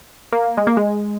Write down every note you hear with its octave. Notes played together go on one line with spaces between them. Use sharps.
A#3
G#3
A#3
G#3